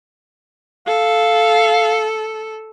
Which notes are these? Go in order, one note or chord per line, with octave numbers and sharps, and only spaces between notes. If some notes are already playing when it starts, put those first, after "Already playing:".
A4 F5